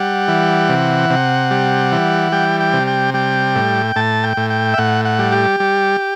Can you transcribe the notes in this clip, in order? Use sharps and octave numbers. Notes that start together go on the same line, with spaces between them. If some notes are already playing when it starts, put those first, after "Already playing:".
Already playing: G3 F#5
E3
C3
C3
G3
E3
G3 G5
G5
C3
G5
G3 G5
A2
A2 A5
G5
A2
G5
E5
A2 F#5
F#5
G3
G4
G3